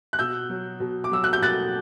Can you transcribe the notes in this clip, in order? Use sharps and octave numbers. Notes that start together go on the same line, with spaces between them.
F#6
B2 E6 G6
F#3
B2
D6
F#3 E6
F#6
G6
B2 F#6 A6